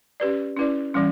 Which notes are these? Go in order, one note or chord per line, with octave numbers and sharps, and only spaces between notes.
C#4 G4 B4 D5
C#4 E4 B4 D5
E3 G3 C#4